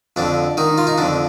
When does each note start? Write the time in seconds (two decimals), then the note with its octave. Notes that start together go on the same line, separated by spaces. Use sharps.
0.16 F2 D3 D4
0.57 D#3 D#4
0.78 F4
0.87 D#4
0.98 F2 D3 D4